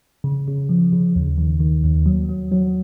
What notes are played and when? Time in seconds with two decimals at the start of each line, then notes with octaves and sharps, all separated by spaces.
0.24 C#3
0.48 C#3
0.69 F3
0.92 C#3
1.16 D#2
1.38 D#3
1.60 D#3
1.83 D#2
2.06 F#3
2.29 F#3
2.52 F#3